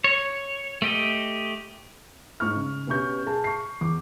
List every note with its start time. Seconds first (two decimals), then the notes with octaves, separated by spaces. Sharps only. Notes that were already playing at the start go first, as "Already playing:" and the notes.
0.04 C#5
0.82 A3 G4 D#5
2.40 G#2 D#4 C#6 F6
2.56 C#3
2.87 B2 B3 C#4 G4 C#6 G6
3.26 G#4 A5
3.44 C#6 C7
3.81 E2 D6